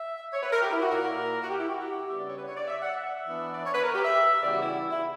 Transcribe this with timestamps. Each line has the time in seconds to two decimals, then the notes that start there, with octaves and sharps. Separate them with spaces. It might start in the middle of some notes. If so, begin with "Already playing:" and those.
Already playing: E5
0.33 C#5
0.43 B4
0.52 A#4
0.62 G4
0.71 E4
0.81 F#4
0.91 A#2 A#3 E4 A#4
1.43 F#4
1.49 G4
1.59 E4
1.70 F#4
1.80 G4
2.09 C#3 G3 B3 D4 E5
2.19 D5
2.29 C#5
2.38 B4
2.48 C#5
2.57 D5
2.68 E5
2.82 F#5
2.97 E5
3.26 E3 B3 D4
3.55 D5
3.66 C#5
3.74 B4
3.84 A#4
3.95 G4
4.05 E5
4.43 C#3 E3 G3 B3 G4 D5
4.53 F#4
4.62 E4
4.91 E4